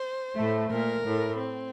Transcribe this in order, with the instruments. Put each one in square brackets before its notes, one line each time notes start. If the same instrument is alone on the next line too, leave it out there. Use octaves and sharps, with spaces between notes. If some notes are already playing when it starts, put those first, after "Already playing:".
Already playing: [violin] C5
[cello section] A2 A3
[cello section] A#2 [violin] A#4
[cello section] A2
[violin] C4